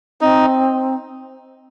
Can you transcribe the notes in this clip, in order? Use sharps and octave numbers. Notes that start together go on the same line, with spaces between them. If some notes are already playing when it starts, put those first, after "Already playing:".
C4 D#4